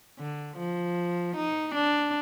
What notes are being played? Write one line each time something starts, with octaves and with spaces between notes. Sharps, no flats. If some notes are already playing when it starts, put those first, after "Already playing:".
D3
F3
D#4
D4